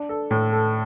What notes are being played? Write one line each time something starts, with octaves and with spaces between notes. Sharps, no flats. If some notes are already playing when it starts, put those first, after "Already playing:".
Already playing: D4
A4
A2
A4